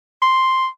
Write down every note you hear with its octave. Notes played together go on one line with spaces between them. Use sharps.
C6